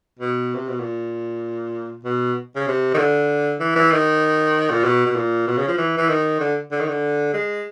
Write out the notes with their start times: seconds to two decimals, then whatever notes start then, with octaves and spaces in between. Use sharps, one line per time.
0.19 B2
0.55 C3
0.68 B2
0.81 A#2
2.05 B2
2.56 C#3
2.67 C3
2.94 D#3
2.98 D3
3.60 E3
3.76 E3
3.92 D#3
4.71 A#2
4.84 B2
5.06 B2
5.16 A#2
5.48 B2
5.58 C#3
5.68 F3
5.78 E3
5.98 E3
6.09 D#3
6.40 D3
6.71 D3
6.80 D#3
6.88 D3
7.34 G#3